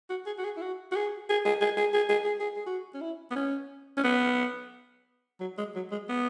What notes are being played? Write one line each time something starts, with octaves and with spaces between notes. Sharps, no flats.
F#4
G#4
F#4
G#4
E4
F#4
F#4
G#4
G#4
G#4
G#4
G#4
G#4
G#4
G#4
G#4
G#4
F#4
C#4
E4
B3
C#4
C#4
B3
F#3
G#3
F#3
G#3
B3